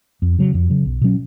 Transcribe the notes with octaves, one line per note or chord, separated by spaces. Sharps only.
F2
C#3 F#3
F2
C#3 F#3
B1
B2 F#3 C#4